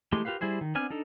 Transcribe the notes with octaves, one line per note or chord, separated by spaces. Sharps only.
E3 G#3 A3 G4 C6
F4 G4 A#4 B4 F5
G3 E4 G#4 C5
D#3
B3 C4 D4 G#5 F6
D4 D#4 A4